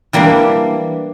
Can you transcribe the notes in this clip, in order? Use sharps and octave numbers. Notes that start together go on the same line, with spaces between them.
E3 G3 A#3 D4